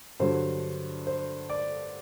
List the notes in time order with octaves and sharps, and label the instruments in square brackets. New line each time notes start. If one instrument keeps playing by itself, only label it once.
[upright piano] G2 D3 F#3 C5
C5
D5